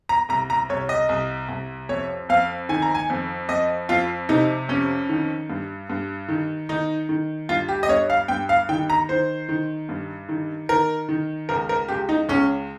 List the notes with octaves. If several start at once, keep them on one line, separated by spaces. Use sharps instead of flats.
A#5
C2 A#5
A#5
C2 C#5
D#5
C2
C2
F2 C#5
F2 F5
D#3 G#5
A#5
G#5
F2
F2 D#5
F2 F4
C3 D#4
F2 C#4
D#3
G2
G2
D#3
D#3 D#4
D#3
G2 F4
G4
D#5
G2 C#5
F5
G2 G5
F5
D#3 G5
A#5
D#3 C5
D#3
G2
D#3
D#3 A#4
D#3
C#2 A#4
A#4
C#2 G4
D#4
C#2 C#4